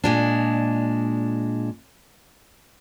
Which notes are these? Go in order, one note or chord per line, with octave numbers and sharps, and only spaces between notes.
A#2 G#3 D4